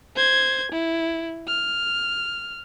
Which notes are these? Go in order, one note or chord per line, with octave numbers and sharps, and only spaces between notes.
C5 G#6
E4
F6